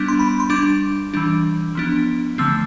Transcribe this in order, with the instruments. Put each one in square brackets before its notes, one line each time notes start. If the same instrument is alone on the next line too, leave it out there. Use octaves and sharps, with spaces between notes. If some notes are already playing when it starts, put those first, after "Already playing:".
Already playing: [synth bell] G3 B3 D4
C6
B5
C6
G3 D4 D6
E3 G3 D4
F3 B3 D4
D3 F3 A3 C4 E6